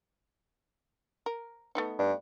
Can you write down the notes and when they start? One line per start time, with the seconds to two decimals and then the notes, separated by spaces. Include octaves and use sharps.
1.26 A#4
1.75 A3 B3 D#4
1.99 G2